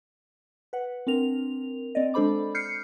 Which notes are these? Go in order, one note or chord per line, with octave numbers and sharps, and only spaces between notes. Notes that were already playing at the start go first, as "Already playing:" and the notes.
B4 F#5
C4 D4 A#4 F7
C4 D5 D#5
G#3 D4 A4 C5 B5 D6
F6 G6 C7 C#7